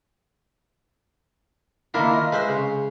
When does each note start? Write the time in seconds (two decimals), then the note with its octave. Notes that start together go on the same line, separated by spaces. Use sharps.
1.94 D#3 A#3 D4 E4 F4 A#4
2.13 D#5
2.32 G#3 B4 C5 E5
2.48 C#3